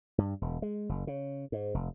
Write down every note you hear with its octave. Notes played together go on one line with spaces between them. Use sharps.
G2
E1
G#3
F#1
C#3
G#2
F1